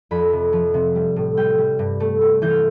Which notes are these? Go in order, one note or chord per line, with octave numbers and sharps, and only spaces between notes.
F2 B5
C3
F3
C3
G3
A2
G3 G5
G3
G2
A3
A3
E3 G6
F6